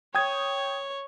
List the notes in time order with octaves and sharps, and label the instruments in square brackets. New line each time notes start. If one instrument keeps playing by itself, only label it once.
[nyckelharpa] C#5 [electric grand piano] G5 D#6 G#6